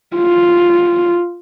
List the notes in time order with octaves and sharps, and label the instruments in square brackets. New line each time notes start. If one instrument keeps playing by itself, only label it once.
[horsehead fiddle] F4